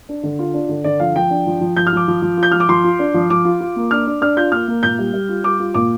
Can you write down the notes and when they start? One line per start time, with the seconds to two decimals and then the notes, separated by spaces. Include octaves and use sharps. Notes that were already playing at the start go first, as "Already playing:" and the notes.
0.09 D4
0.23 D3
0.39 F4
0.54 D4
0.69 D3
0.84 D3 D5
1.00 F3 F5
1.16 F3 G5
1.30 D4
1.47 F3
1.61 F3
1.76 F3 G6
1.87 F6
1.93 F3 D6
2.08 F3
2.22 F3
2.37 F4
2.43 G6
2.51 F3 F6
2.60 D6
2.69 F3 C6
2.84 F4
2.99 D4
3.14 F3
3.30 F3 D6
3.45 F4
3.60 F4
3.76 A#3
3.91 D4 F6
4.07 D4
4.21 D4 F6
4.36 F4 G6
4.52 A#3 F6
4.68 A#3
4.83 A#2 G6
4.99 G3
5.14 G3
5.29 F4
5.44 G3 D6
5.59 F4
5.74 A#2 D6